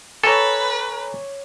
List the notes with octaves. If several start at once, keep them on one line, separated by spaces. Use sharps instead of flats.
A4 B4 C#5 G#5 A#5 D6